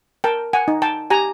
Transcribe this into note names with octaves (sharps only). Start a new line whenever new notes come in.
A#4 G5 A5
F#5 G#5
D#4
G5 A5
G4 G#5 A#5